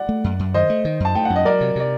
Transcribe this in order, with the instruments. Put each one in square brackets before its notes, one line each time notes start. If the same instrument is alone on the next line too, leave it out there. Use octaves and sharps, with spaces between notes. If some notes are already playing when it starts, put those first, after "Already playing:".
Already playing: [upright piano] D5 F#5
[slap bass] A3
F#2
F#2
[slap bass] D#3 [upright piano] C5 D#5
[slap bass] A3
D#3
[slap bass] F#2 [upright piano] A5
[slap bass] A3 [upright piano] G5
[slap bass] F#2 [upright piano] F#5
[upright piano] D#5
[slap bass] F#3 [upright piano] A#4 D5
[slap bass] C3
[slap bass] C3 [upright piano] D5